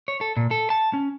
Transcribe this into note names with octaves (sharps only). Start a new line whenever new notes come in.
C#5
A4
A#2
A4
A5
C#4